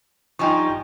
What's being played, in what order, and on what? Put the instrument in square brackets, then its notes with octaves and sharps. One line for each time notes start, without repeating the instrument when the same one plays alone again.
[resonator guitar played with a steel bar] F3 G3 D#4 [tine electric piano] G5 G#5 C#6